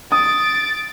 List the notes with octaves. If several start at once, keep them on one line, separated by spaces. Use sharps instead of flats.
D#6 A6 D7